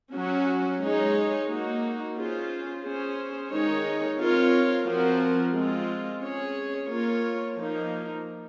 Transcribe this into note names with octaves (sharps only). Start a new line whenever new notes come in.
F#3 C#4 F#4
G#3 D#4 G#4 C#5
A#3 D#4 F#4
C#4 F4 G#4 C5
C#4 G#4 C5
D#3 G#3 D#4 G#4 C#5
C4 F4 A#4 C#5
F3 C4 F#4 A#4
G#3 C4 F4
C#4 G#4 C#5
A#3 F4 A#4 C#5
F3 A#3 D#4